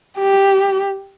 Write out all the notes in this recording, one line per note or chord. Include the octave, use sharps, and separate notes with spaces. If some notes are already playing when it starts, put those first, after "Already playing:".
G4